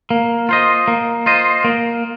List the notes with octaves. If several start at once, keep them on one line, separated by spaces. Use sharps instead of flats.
A#3
F4 C5 D#5
A#3
F4 C5 D#5
A#3